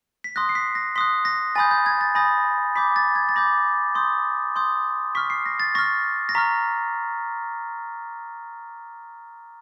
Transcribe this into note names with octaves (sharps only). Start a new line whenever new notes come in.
B6
C6 D#6 F#6 A#6
C7
B6
A#6
C6 D#6 F#6 B6
A#6
G#5 B5 D#6 G6 A6
G6
G#6
A6
G#5 B5 D#6 G6 A#6
B5 D6 G6 B6
A6
G#6
A6
B5 D6 G6 A#6
C6 D#6 G6
C6 D#6 G6
C#6 F6 B6
C7
A#6
A6
C#6 F6 A#6
A#6
A#5 C#6 F6 B6